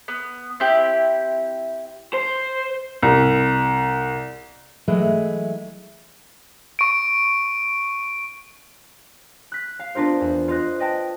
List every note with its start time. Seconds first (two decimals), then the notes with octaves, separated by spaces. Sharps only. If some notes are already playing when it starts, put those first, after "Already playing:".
0.08 B3
0.60 C4 E4 G4
2.14 C5
3.03 C2
4.88 E3 F#3 G#3 A3
6.79 C#6 D7
9.52 F#6 B6
9.79 F5
9.95 B3 D4 F4 A#4 C5
10.21 E2
10.48 F4 C5 D#5 F#6
10.79 B4 D#5 G5 A5